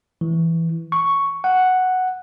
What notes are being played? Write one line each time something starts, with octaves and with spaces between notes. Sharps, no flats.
E3
C#6
F#5